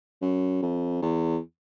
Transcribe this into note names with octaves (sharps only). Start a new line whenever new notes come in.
F#2
F2
E2